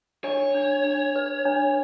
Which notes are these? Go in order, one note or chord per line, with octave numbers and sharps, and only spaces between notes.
D4 C#5
D4
D4
B4
D4